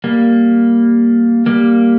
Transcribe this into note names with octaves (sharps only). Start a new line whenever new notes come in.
G3 A#3
G3 A#3